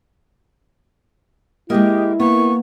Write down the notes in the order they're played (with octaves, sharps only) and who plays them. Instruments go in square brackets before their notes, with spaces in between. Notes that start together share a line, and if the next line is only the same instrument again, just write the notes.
[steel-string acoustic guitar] G#3 A#3 [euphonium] E4 [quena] G4 [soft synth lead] D#5
[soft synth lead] A#3 [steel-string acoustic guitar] B3 [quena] C#6